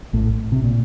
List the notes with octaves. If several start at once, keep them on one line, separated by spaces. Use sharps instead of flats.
A1 A2
C3
A#2